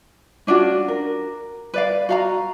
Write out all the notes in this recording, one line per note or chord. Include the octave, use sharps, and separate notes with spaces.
C#4 D4 F4 F#4
A#4
B4 D5 F5
F#4 F5 A#5